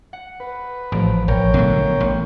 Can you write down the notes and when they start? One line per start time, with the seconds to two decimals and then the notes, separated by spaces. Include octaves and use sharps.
0.13 F#5
0.40 B4
0.92 A1 F3 A#5 D7
1.28 A#1 A#4 C#5 G5
1.54 B2 D3 F#3 A3 A#3
2.00 A1